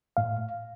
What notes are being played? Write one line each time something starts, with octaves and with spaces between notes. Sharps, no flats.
A2 F5